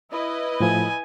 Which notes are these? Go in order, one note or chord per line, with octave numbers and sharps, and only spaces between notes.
E4 B4 D#5
A2 F3 G#5